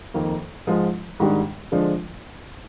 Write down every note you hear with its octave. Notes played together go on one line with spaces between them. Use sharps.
F2 D#3 A#3
G#2 F3 G#3
G#2 D#3 G3 D4
D3 F3 G#3 D4